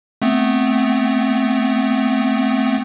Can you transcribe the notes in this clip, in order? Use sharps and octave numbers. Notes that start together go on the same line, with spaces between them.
A3 B3 C4